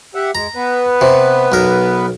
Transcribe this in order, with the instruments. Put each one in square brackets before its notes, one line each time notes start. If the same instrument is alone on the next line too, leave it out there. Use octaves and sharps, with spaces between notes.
[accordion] G4 E5 F#5
[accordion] G#3 [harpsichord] A#5
[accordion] B3 B4
[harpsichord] C3
B1 A#4